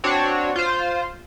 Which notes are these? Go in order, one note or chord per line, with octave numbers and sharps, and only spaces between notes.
C4 D4 F#4 C#5
F4 C5